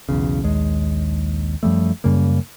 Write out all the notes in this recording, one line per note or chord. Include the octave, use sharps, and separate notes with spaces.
B1 E2 C#3
A#1 D#2 G#3
F#2 F3 G3 A3
F#2 C#3 G3 A#3